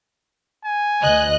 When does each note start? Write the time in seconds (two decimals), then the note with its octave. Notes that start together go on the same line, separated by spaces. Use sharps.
0.65 G#5
1.02 D2 D#5 F#6